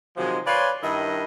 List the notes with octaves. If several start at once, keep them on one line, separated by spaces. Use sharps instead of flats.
C3 D#3 F3 F#3 G#3
B4 C#5 D5 F5 G#5 C6
G2 D#3 E4 A#4 D#5